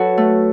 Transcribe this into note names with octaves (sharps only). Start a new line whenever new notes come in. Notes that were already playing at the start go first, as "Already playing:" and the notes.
Already playing: F#3 F#4 A4 B4
A3